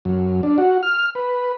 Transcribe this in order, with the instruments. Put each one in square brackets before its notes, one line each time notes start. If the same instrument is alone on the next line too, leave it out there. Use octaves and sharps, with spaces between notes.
[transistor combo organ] F#2
D4
F#4
F6
B4